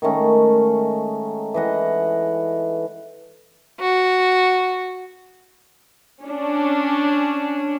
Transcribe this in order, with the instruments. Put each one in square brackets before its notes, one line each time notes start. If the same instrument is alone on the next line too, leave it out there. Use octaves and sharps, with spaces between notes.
[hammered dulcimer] D#3 G#3 A3 C#4
E3 D#5 F#5
[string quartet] F#4
[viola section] C#4 D4